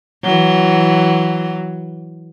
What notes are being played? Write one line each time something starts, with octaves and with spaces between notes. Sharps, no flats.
E3 F#3